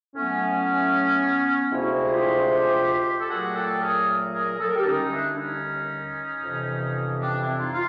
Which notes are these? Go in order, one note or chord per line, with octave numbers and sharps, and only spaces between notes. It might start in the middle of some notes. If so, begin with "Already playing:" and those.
A2 F#3 A3 B3 C#4
D2 C3 F3 G#3 E4 F#4
G#4
F4 G4
A4
A#2 F#3 A3 F#4 G#4
G4 A4
G#4 A#4
G#4 A#4
A4
A#4
G4 A4
D#2 D3 G3 C#4 D#4
D4 E4
D4
C#4 D#4
F2 C3 E3
C4 D4
D4 E4
D#4 F4
F4